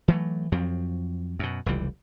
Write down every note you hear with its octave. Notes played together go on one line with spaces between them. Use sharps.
E3 F#3 A3
F2 F3 F#3 C4
F#2 B2
F1 C#2 E3 G3